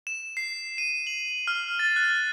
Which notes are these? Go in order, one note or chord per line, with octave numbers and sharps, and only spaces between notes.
E7
C7
D#7
F#7
F6
A6
F#6